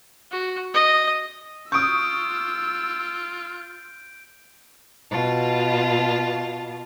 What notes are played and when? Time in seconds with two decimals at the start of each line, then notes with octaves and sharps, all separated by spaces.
0.32 F#4
0.74 D#5
1.72 F4 C#6 D#6 E6 G6 D7
5.11 B2 F4 A5